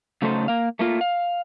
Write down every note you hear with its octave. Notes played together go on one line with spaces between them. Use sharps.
C#3 F#3 A3 D#4 A4 C5
A#3 F5
A3 A#3 F4
F5